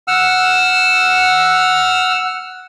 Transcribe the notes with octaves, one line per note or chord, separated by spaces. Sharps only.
F#5 E6 F6